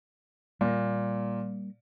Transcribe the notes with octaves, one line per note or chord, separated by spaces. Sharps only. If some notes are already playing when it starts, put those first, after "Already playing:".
A#2 G3 G#3 A#3